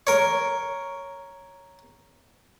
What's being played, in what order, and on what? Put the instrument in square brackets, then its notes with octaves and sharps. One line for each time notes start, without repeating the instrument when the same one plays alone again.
[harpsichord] A#4 C#5